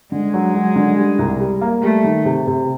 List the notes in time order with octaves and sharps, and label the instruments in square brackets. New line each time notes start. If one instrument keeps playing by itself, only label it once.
[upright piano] D3 [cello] G#3
[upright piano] F#3
F#3
D3
G3
C2
G3
A#3
[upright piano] G3 [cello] A3
[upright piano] D#3
C3
C3